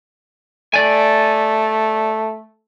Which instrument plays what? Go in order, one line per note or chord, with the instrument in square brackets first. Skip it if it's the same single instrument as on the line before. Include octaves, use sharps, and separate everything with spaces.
[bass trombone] A3 [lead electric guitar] D5 G#5